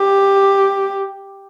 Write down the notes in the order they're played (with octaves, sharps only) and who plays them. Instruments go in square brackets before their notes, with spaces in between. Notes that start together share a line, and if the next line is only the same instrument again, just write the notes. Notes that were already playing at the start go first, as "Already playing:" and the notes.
Already playing: [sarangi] G4